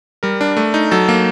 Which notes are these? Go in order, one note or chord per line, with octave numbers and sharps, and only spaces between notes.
G3 A#4
D4
A3
D#4
F#3 A4
A#3